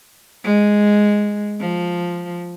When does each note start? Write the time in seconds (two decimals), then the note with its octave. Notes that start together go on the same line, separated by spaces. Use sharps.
0.44 G#3
1.60 F3